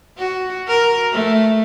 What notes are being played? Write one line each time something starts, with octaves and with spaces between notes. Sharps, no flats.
F#4
A#4
A3